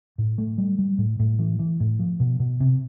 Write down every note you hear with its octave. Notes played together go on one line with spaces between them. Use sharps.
A2
A3
G3
G3
A2
A2
E3
E3
A2
F3
B2
B2
C3